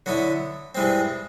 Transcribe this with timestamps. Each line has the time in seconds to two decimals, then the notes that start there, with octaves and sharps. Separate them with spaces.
0.06 D3 F#3 B3 E4
0.75 G2 E3 G#3 C4